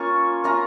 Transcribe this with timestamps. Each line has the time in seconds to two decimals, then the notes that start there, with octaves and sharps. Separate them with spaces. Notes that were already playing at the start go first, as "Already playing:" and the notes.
Already playing: A#3 C#4 F4 C#6
0.44 A#3 C#4 F4 A#5